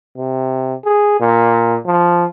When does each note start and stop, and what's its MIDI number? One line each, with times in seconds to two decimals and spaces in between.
0.17 0.74 48
0.85 1.20 68
1.20 1.78 46
1.86 2.25 53